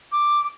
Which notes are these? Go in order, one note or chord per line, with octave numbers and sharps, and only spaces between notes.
D6